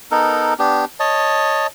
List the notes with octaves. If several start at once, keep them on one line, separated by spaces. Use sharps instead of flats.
B3 D#4 A4 A#4
B3 D4 G4
C#5 D#5 A5